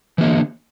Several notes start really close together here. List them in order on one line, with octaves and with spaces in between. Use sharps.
E3 A#3 D3